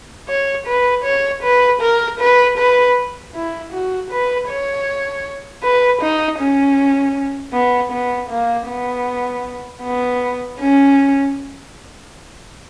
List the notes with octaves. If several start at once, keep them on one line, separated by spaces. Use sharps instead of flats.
C#5
B4
C#5
B4
A#4
B4
B4
E4
F#4
B4
C#5
B4
D#4
C#4
B3
B3
A#3
B3
B3
C#4